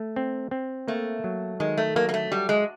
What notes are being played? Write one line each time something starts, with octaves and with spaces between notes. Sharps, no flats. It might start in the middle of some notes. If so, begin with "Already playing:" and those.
Already playing: A3
C4
C4
A3 A#3
F#3
D#3 G#3
A3
F#3 A#3
A#3
A3
G3 F#4
G#3